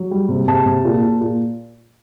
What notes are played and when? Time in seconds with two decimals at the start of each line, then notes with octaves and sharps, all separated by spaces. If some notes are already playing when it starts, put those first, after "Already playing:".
Already playing: F#3
0.11 G3
0.29 C3
0.47 C3 A5
0.66 C3
0.85 A#2
1.03 A#2
1.21 A#2